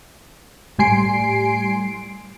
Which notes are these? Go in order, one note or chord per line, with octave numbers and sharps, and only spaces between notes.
A2 G3 G#5 C6 C7 D7